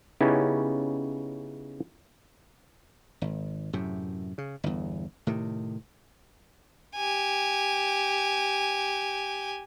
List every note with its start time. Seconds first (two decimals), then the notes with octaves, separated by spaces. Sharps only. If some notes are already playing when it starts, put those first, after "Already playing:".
0.21 C#3 B3 C#4 D#4 E4 G4
3.22 G#1
3.73 F#2 A2 C3
4.38 C#3
4.64 G1 E2
5.27 A2 C3 D#3
6.96 G4 G#5